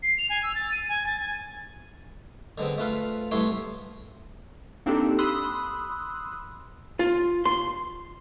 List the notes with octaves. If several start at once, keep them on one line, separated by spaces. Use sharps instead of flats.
C7
F7
G#5
E6
A6
D#7
G#5
A6
G#5
D3 G#3 B3 C4
A3 F4 B4 F5
C2 A2 A3 B3 C#5 C6
A#3 C4 D4 D#4 G4 A4
B5 C6 D#6 E6 F#6
F4
C6